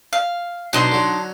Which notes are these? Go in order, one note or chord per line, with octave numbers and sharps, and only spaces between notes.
F5
B2 F#3 D4 D#4 C6
D3 F#3